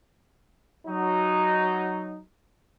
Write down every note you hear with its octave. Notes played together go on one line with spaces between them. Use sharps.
F#3 D#4